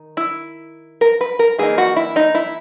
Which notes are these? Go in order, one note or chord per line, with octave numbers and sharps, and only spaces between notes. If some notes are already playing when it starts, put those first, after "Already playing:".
Already playing: D#3
E4
A#4
B4
A#4
E3 A#3 D#4 G#4
F#4
E4
D#4
E4